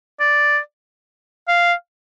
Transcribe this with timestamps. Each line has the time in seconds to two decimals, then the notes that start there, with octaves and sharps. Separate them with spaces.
0.20 D5
1.48 F5